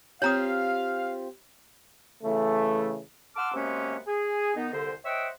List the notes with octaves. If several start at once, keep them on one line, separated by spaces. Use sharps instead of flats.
C4 F4 G4 C#5 F5 A#5 D#6
C#3 E3 A3
F#5 A5 C6 D6 E6 F6
F#2 C3 G#3 A#3 B3 C#4
G#4
D#3 B3 D#4
C2 D3 C5
C5 C#5 D#5 E5 F#5 G5